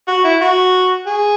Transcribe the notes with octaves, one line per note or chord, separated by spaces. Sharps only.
F#4
E4
F#4
G#4